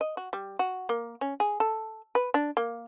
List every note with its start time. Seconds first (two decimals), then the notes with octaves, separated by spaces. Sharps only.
0.01 D#5
0.17 F#4
0.33 G3
0.59 F#4
0.89 A#3
1.21 C#4
1.40 G#4
1.60 A4
2.15 B4
2.34 D4
2.57 A#3